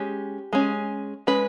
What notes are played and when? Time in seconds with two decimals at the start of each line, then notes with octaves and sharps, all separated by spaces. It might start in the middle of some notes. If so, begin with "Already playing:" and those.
Already playing: G#3 C#4 G4
0.53 G#3 C#4
1.27 G#3 C#4 B4